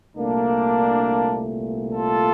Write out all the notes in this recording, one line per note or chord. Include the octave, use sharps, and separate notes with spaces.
C2 A#2 A3 A#3 D4
F4 A4